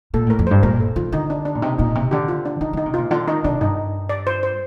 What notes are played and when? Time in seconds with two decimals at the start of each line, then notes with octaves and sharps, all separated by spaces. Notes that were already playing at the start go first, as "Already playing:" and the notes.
0.14 A#2 A4
0.27 A2 A#4
0.39 F2
0.47 C5
0.51 G2
0.63 A#2 A#4
0.80 A4
0.96 D#3 F4
1.12 D3 D#4
1.30 D4
1.45 D4
1.55 A#2
1.62 C3 D#4
1.78 A#2 D#4
1.95 C3
2.11 D3 G4
2.28 F4
2.46 D4
2.61 D#3 D#4
2.73 D3 D#4
2.86 C3
2.94 F4
2.98 A#2
3.11 D3 F4
3.28 D#3 D#4
3.44 C3 D4
3.61 G2 D#4
4.09 D5
4.27 C5
4.43 C5